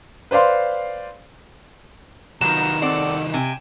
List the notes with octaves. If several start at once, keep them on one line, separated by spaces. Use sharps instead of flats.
B4 C5 D5 F5 C6
C2 D#3 F#3 B3 F4 A#5 E7
C4 A4 D5 F#5
C3 G5 G#5